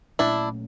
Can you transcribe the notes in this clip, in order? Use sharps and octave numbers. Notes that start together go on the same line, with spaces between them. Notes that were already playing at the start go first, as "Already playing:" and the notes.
A#2 F#3 A3 C#4 D4 E4